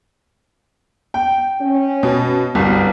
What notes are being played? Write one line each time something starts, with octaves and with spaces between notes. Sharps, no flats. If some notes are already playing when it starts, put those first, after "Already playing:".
G5
C#4
B2
G1 C2 G2 B2 B3